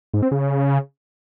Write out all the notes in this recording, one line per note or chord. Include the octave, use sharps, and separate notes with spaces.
G#2
C4
C#3